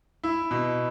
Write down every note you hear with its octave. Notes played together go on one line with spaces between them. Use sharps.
E4
B2